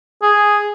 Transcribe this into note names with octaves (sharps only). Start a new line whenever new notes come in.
G#4